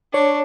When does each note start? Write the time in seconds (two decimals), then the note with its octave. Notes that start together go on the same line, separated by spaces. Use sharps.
0.14 D4 C#5